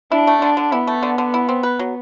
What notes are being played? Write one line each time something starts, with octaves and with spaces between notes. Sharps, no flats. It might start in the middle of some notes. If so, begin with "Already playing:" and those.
D4 E4
A3
D3 D4
D3
B3 E4
A3
D3
D3
E4
C4
B4
F#3